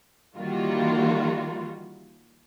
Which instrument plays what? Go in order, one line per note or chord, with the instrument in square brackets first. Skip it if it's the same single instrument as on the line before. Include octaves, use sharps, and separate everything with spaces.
[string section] D#3 E3 G3 A#3 F4 F#4